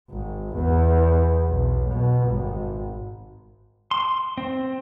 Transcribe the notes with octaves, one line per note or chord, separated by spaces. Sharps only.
G#1
E2
B1
B2
G#1
C6
C4